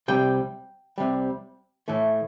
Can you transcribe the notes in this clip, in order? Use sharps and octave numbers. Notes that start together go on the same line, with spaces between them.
C2 C3 G3 G5
C2 C3 G3
A2 E3 A3